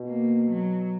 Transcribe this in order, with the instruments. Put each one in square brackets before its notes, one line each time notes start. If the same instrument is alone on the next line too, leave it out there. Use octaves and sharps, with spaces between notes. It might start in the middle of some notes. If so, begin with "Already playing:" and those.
Already playing: [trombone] B2
[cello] A#3
F#3